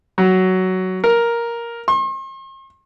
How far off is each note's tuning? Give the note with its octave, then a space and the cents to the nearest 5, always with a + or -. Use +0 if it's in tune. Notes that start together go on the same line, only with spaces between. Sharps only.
F#3 +10
A#4 +5
C6 +45